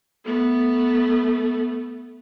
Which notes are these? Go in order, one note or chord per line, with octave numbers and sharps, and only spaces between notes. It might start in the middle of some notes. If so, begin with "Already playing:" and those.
A3 B3